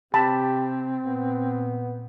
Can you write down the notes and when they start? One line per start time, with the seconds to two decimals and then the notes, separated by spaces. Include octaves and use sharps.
0.14 C3 C4 G4 A5 B5
1.07 A#2 B3